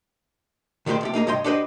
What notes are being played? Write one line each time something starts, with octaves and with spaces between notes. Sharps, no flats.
D#3 G3 G#3 F#4 G4 C5
B1 C3 G4
A#3 D#4 G#4 A#5
G2 C3 C#5 D#5 G5 C6
D4 F#4 G4 B4 C5 D#5